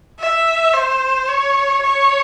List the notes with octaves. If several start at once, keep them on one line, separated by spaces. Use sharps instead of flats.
E5
C5
C#5
C#5